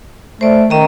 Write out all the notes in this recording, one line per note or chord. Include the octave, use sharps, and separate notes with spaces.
A3 C5 D5
D#3 C#4 D#5 A#5